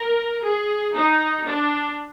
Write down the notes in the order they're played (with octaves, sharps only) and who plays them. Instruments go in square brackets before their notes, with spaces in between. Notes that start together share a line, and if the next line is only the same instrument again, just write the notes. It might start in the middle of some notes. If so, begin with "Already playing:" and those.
Already playing: [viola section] A#4
G#4
D#4
D4